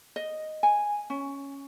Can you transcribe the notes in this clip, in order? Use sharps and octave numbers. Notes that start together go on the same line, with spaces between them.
D#5
G#5
C#4